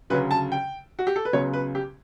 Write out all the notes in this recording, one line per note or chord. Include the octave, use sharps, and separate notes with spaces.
D2 C#3 F#3 B4
A5
G5
F#4
G4
A4
B4
C#2 C#3 F#3 B3 C#5
B4
G4